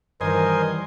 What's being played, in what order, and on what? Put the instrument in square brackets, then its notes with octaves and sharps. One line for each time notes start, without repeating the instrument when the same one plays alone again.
[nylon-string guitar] G2 D#3 E3 [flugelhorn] A#4 [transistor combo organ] C5 D#5 G#5